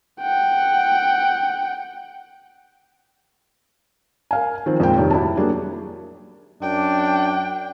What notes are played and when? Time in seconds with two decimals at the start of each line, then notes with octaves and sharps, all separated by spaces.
0.22 F#5 G5
4.31 A#4 F5 G#5
4.66 D#3 F3 C4
4.80 F2 A#2 G#3 G5
4.95 F1 G2 D#3 G4 C#5 D5
5.11 E4 F#4 A5
5.36 F#3 G3 A#3 D4 G#4
6.62 F#2 D4 G5